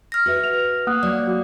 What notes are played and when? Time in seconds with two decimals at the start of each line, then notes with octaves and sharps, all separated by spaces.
0.12 F6 A#6
0.26 F#4 B4 E5
0.44 F7
0.87 A#3 F#5 D#6 F#6
1.03 F#3 D5
1.27 F#4